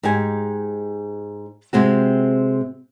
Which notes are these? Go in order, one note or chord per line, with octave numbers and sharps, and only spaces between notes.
G#2 D#4 G4 G#5
C3 G#3 C4 F#4